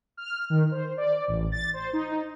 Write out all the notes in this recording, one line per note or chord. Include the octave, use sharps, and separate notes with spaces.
F6
D#3
C5
D5
A1
A6
C5
D#4